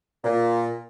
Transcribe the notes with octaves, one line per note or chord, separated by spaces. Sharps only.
A#2